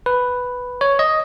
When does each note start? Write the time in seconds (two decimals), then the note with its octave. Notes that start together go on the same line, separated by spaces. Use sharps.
0.06 B4
0.81 C#5
0.99 D#5